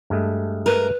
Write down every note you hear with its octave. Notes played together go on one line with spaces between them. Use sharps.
G2 G#3 A3
A#4 B4